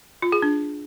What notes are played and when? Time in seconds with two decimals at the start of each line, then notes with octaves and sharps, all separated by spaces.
0.22 F4
0.32 G#4
0.42 D4